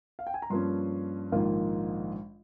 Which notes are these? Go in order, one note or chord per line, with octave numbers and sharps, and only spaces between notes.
F5
G5
G#5
A#5
G2 F3 A#3 C#4 C6
A#1 G#2 D#3 A#3 F4